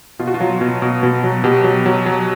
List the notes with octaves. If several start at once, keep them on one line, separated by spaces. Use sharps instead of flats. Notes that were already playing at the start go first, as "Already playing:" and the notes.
B2 F4
F#4
F4
F#3
B2
B2
B2
F#3
B2 G4
F#3
F#3
F#3